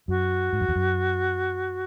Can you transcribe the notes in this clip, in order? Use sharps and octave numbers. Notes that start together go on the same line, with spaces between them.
F#2 F#4
G#2
F#2
E2
F#2